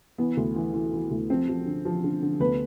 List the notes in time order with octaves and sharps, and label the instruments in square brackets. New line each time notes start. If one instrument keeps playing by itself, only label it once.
[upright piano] E3 B3
D2
E3
E3
E3
D2
F3 C4
F3
D3
F3
D3
D3
D2 B3 B4